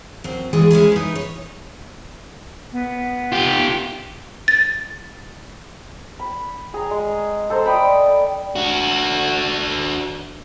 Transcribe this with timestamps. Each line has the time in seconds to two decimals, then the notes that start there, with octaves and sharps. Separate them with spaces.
0.24 F#2 C4
0.53 E3 G#3 G#4 D5
0.71 G#3 C#4 E4 G#4
0.92 D#4 B4
1.15 C#5
2.72 B3
3.32 F4 G4
4.48 A6
6.19 B5
6.74 G#4 A#5
6.91 G#3
7.50 A4 C5 A#5
7.66 D5 D#5 G5 B5
8.56 D4 F#4